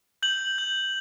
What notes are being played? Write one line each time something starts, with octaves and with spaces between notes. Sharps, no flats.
G6 F#7
G6